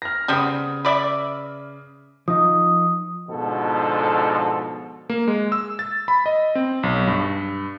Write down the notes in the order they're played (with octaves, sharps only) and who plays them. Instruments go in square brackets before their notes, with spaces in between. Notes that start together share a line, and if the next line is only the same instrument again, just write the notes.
[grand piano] F6 A#6
[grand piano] C#3 D#6 [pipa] G3 B3 C4
[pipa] B4 D5 E5
[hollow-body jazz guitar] F3 D#4 [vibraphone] D#6
[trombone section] G#2 B2 D3 F3 A4
[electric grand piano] A#3
G#3
E6
A6
B5
D#5
C4
B1
G2